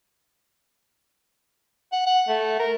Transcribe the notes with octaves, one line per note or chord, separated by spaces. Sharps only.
F#5
F#5
A3
A#4